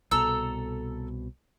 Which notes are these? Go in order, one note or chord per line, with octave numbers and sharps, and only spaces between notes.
C2 B2 A4 A#5 E6